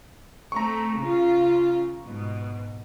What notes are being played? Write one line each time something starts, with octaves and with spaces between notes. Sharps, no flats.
A3 C4 A#5 C#6
C#3 F4
G#2 B2